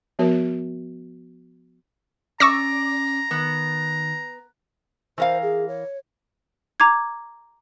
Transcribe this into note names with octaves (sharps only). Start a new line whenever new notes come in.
F3 B3 F#4 A#4 C#5
C#4 D5 A#5 C#6 E6 A#6
D#3 B3
E3 A#4 C5 F5
G#4
C#5
A#5 D6 G#6